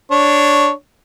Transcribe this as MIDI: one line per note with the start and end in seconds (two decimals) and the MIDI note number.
0.11 0.71 62
0.11 0.71 73